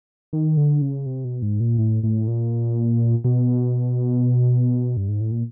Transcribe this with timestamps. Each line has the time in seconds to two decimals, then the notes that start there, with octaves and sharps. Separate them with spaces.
0.33 D#3
0.57 D3
0.82 C#3
1.06 C3
1.24 B2
1.42 G#2
1.60 A#2
1.78 A2
2.03 A2
2.28 A#2
3.24 B2
4.97 G2
5.08 G#2
5.20 A2
5.31 A#2